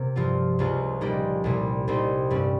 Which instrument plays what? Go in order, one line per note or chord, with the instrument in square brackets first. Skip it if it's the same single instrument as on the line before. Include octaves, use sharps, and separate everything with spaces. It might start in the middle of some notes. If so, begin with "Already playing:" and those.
Already playing: [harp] C3 A#3
G2 F3 C4 F4
C#2 C#3 F3 C4 F4
A#2 G3 A#3 D#4
C2 A#2 G3
C2 C3 G3 C4 D#4
G2 G3 C#4